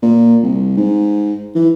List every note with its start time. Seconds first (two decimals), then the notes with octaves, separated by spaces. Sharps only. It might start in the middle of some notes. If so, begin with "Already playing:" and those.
0.02 A#2
0.43 C2
0.77 G#2
1.55 E3